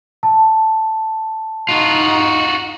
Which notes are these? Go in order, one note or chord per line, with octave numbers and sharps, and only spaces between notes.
A5
D#4 F4 F#4